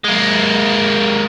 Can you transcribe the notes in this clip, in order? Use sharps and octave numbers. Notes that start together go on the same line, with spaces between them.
G#3 A#3